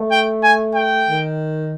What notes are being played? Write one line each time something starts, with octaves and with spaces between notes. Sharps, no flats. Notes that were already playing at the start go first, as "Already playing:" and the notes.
Already playing: A3
G5
G#5
G5
D#3